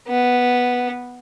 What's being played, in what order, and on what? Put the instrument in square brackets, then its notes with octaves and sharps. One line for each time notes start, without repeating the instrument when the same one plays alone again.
[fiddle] B3